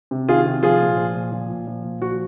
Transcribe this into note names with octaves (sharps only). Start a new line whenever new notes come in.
C3
D#3 F4 G#4
C3
F3 F4 G#4
A#2
F3
A#2
F3
A#2
F3
A#2
F3 F#4